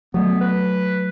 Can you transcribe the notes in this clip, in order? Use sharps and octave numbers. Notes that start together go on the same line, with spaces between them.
F#3 A3 B3
B4